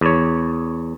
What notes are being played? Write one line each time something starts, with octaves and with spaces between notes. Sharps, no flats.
E2 C#5